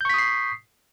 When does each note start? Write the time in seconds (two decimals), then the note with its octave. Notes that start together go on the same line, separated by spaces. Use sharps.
0.01 G6
0.05 C#6
0.09 B6
0.14 D#6
0.18 C7